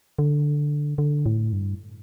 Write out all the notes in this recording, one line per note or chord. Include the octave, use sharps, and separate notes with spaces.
D3
D3
A2
G2